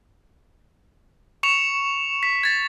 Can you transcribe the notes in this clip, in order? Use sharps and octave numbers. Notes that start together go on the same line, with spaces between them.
C#6 C#7 E7 F7
B6
G#6 A6